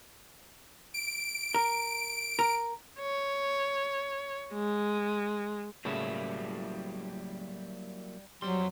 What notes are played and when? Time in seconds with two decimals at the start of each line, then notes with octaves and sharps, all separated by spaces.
0.94 D7
1.54 A#4
2.39 A#4
3.00 C#5
4.54 G#3
5.85 A2 C#3 F#3 G3 A#3 E4 E5
8.42 F2 F#3 G3 C4 C6